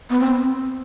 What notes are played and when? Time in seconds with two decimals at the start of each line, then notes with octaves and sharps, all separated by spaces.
0.10 B3
0.20 C4